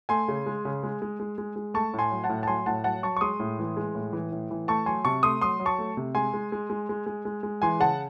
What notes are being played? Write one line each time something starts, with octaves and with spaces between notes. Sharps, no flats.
A3 G#5 C6
C#3
G#3
C#3
G#3
G#3
G#3
G#3
G#3
A3 A5 C#6
A2
G#5 C6
F#3
F#5 A5
A2
A5
F#3 G#5 C6
A2 F#5 A5
F#3 F#5 A5
F#3 A5 C#6
C#6
G#3 C6 D#6
A2
E3
G#3
A2
E3
A2
E3
A3 A5 C#6
F#3 G#5 C6
C3 A5 C#6
A3 C6 D#6
F#3 C6 D#6
F#3
A5 C#6
A3
C3
G#3 G#5 C6
G#3
G#3
G#3
G#3
G#3
G#3
G#3
E3 G#5 C6
C#3 F#5 A5